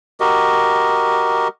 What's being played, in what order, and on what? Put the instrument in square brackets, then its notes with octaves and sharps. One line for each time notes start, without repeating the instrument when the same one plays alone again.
[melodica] F#4 G4 A#4 D#5